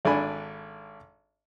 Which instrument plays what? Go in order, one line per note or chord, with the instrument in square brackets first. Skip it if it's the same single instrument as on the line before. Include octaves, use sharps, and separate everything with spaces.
[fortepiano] G#1 D4 A4 G#5 B5